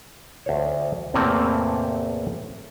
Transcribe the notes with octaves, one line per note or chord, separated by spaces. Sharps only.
D2 C5 C#5
E2 A2 C3 A3 A#3 C4